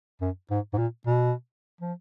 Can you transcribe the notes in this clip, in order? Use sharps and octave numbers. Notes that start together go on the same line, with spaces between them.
F#2
G#2
G#2
A#2
B2
F3